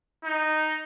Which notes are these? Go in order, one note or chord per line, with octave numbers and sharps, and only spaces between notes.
D#4